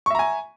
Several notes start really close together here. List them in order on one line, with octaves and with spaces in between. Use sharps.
C#6 E5 A#5 G#5